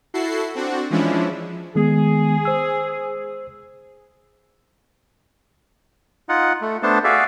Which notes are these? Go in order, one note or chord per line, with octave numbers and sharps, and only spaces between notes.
E4 F#4 A4 C7
C4 D4 F#4
E3 F3 G#3 C#4 D4 E4
D#3 G#3 B3 G#4
C5 E6
D#4 F4 F#5
A3
A3 B3 D4 C5 A5
F#4 G#4 D5 E5 F5